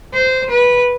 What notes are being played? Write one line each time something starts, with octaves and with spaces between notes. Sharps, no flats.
C5
B4